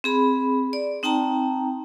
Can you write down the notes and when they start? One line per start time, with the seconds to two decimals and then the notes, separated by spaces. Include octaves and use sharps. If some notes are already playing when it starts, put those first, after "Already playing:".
0.04 C4 G#4 B5
0.73 D5
1.03 C4 D#4 G5 A5 A#5